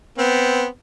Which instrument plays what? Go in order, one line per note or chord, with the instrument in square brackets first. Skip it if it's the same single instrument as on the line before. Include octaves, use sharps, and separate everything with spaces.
[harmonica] B3 C4